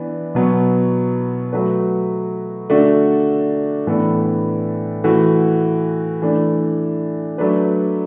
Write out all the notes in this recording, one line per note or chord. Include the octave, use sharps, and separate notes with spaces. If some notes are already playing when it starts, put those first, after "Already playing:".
Already playing: E3 B3 D4
B2 F#3 B3
F#3 A3 F#4 B4
D3 A3 D4 F#4
A2 E3 B3 D4 A4
E3 A3 F#4
E3 A3 D4
F#3 A3 D4 B4